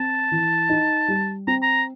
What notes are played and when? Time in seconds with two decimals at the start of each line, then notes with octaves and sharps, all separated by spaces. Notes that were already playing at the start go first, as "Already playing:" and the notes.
Already playing: C4 A5
0.31 E3
0.69 D#4
1.08 G3
1.47 C4 A#5
1.62 A#5